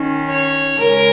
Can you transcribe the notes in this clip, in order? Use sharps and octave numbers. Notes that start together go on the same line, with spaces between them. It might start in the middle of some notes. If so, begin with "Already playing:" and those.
Already playing: D#3 C#4
C#5
C#3 G#3 C#4 A#4